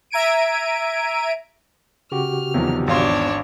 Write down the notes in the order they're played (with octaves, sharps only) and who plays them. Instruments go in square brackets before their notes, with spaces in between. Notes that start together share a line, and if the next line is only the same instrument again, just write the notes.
[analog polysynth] E5 A#5 G#6 D7 D#7
[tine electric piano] C#3 F#4 G4 [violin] F6
[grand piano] E2 D#3 F3 [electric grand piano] C3 F#3
[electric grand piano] G#1 F5 C6 [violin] D4 C#5